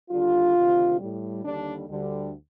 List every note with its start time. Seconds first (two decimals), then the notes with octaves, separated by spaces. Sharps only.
0.10 D#2 D3 G3 F4
0.56 D2 C3 D#3
1.00 A2 G3
1.44 D#2 D3 G3 D4
1.89 D2 D3 G3